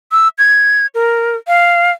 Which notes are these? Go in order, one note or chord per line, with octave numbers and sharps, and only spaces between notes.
E6
G#6
A#4
F5